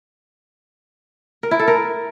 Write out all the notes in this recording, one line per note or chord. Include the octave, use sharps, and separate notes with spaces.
A#4
E4
A4
A#4